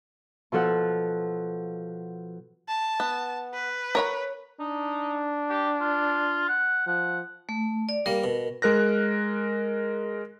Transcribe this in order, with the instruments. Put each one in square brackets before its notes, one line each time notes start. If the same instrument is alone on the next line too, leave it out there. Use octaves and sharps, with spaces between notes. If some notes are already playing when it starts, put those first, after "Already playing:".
[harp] B2 F3 A4 F#5
[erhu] A5
[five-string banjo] B3
[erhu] B4
[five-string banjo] A#4 C#5 B5
[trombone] D4 [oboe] D#4
[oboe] G4
F4
F#5
[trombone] F3 [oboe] F#5
[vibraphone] A3
D5
[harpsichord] G3 A#3 [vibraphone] A#4
[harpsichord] B2
[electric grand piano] G#3 A#4 F#6 A#6